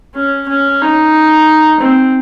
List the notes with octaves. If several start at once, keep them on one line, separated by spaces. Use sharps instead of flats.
C#4
C#4
D#4
C4